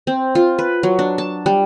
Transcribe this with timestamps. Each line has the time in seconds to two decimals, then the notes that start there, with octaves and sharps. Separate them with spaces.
0.07 C4
0.35 F4
0.58 B4
0.83 F#3
0.99 D4
1.18 A5
1.46 G3